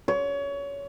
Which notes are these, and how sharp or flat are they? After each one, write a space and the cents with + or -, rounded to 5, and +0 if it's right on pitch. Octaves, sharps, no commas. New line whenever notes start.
C#5 +25